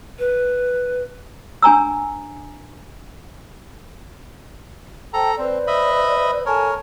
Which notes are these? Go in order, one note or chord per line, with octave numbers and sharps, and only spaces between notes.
B4
D4 G#5 A#5 E6
A4 C5 G5 A5 A#5
C4 B4 C5 D5
D#5 E5 B5
A4 A#4 C#5 G#5 A5